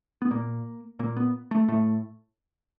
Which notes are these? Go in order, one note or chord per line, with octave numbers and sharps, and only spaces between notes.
B3
A#2 A#3
A#2 A#3
B3
A3
A2 A3